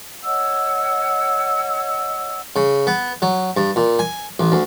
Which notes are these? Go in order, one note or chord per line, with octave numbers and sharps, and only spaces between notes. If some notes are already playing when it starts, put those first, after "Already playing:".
C#5 D#5 F#5 E6
C#3
B3
F#3
G2
A#2
G#5
A1
D2